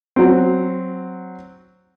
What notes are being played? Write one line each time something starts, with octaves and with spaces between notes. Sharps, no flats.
F#3 C4